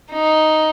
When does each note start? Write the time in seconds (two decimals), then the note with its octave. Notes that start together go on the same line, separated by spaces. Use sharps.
0.12 D#4